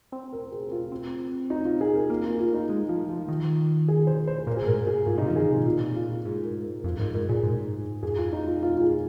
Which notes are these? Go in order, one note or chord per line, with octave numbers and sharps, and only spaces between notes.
C4
A#4
G#4
F4
C4
D#4
F4
G#4
A#4
A#3 A#4
F4
F4
D#4
G#3 F4
F3 F4
F3 F4
D#3
G#4
C5
C5
A#2 A#4
G#4
A#2
G#2 A#4
G#4
G#2 F4
C3 D#4
F3 F4
D#3 G#4
C3
A#2 F4
F4
G#2 G#4
A#4
F2 F4
G#2 A#4
G#2 A#4
A#2 G#4
G#2
F2 G#4
F4
D#4
F4
F4
F4
G#4